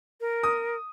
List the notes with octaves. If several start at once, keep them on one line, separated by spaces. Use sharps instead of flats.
A#4
D#6